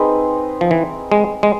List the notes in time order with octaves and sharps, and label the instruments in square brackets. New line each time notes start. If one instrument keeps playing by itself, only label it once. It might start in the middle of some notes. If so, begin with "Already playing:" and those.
Already playing: [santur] C4 D#4 G#4 B4
[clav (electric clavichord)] F3
E3
G#3
G#3